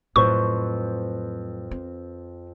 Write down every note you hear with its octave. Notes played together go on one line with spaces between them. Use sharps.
F2 A2 F#3 B4 C5 C#6
C4